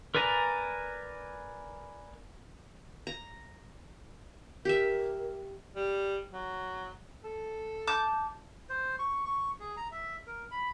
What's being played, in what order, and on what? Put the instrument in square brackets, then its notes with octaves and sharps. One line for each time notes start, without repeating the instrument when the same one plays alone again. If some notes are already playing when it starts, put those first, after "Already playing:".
[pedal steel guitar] A#4 B4 D5 G#5 A#5
[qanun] A#5
[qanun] G4 E5 [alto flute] A#4
[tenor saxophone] G3
F#3
A4
[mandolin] A5 D6 G6
[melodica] C5
C#6
C#6
G#4
A#5
E5
A#4
B5